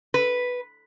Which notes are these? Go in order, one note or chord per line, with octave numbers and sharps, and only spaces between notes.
B4